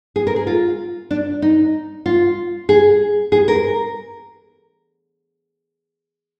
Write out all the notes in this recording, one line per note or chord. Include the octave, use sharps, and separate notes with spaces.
G#4
A#4
G#4
F4
D4
D#4
F4
G#4
G#4
A#4